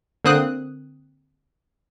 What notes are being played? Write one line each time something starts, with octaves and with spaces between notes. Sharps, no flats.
D3 A#3 C4 D#6 F#6